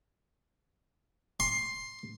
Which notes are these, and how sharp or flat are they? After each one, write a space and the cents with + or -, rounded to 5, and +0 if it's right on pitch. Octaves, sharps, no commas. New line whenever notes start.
C6 +10